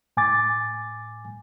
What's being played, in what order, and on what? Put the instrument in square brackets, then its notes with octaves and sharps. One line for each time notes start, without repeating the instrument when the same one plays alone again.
[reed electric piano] A2 G#5 D6 A6